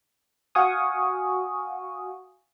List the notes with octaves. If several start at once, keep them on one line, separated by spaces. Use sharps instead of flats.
F#4 F5 F#5 G#5 C#6 D#6